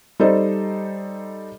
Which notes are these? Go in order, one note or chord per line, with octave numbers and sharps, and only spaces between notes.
G3 D#4 A4 C5 D5 D#5